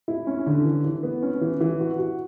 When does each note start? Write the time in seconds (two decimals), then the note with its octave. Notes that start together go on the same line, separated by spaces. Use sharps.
0.08 E4
0.27 C#4
0.46 D3
0.65 E3
0.84 E3
1.03 B3
1.22 C#4
1.41 E3
1.61 E3
1.80 F#4
1.98 F#4